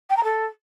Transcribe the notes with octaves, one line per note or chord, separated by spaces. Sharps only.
G5
A#5
A4